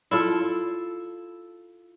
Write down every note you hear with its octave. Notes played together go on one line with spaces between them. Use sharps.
E4 F4 A4